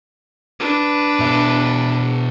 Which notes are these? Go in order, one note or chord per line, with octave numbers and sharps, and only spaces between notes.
D4 B4
B2 E5